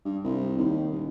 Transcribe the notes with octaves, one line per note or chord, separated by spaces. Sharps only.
G2
C2
D#2
D#1